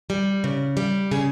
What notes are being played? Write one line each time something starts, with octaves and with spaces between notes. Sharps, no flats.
G3
C#3
G3
C#3 G#4